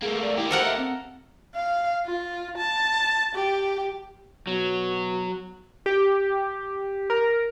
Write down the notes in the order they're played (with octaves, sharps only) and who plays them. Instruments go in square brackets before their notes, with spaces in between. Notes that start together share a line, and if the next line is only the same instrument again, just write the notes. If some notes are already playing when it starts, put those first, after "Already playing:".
[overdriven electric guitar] A3 A#3 [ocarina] G#4
[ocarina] D5
[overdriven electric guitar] A#3 G4 [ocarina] E4
[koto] A4 A#4 F#5 [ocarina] C5
[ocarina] E5
C4
[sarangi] F5
F4
A5
G4
[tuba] B2 [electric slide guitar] F#3
[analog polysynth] G4
A#4